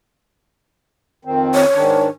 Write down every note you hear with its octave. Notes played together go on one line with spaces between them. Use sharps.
F2 D#3 C4
C#5
G#2 D#3 D4